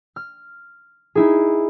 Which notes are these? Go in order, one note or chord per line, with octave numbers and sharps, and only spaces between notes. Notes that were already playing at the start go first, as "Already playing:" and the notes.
F6
D#4 E4 G#4